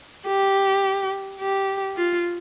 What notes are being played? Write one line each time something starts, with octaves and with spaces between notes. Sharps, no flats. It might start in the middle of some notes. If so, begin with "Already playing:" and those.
G4
G4
F4